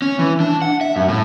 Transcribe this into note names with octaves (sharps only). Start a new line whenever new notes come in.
C#4
E3
D4
F#5
E5
F#2
A2